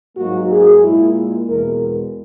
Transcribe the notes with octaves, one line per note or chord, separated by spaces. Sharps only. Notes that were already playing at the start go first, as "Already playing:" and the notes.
G#2 F#3 A#3 F#4
G#4
A#2 G#3 E4
E2 B2 G#3 A#4